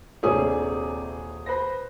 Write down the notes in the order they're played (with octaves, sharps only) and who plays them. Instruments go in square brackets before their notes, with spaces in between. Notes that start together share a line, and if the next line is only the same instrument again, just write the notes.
[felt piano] D#1 G#4 C#5 [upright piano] C3 D4
[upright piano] B4 C5 A#6